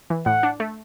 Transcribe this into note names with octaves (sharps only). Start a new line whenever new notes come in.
E3
A2 F#5
D4
A3